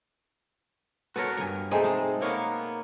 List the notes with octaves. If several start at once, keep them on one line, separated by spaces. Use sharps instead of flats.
B3 F#4 A4 A#4 C#5
D2 G2 A#4 G#5
B2 G#3 A3 C4 D#4 G#4
G#3 A5
A#3 B3 A#4 C#5